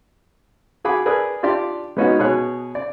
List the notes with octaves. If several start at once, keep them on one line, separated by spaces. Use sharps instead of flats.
F#4 G#4 F#5 B5 D6
G#4 A#4 B4 D5 D#6
D4 F4 G4 D5 C6
G#3 B3 C#4 D#4 F#4 G#4
B2 G#4 C#5 F#6
D5